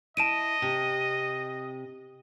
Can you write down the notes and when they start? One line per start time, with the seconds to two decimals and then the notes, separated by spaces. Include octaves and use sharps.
0.17 E4 D#5 A5 D7 D#7
0.62 C3